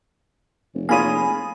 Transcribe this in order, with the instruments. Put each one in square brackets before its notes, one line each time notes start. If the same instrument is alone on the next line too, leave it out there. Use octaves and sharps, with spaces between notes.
[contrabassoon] F1
[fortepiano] A#3 F4 C#5 [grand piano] G#4 D#7 [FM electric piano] G#5 B5 D#6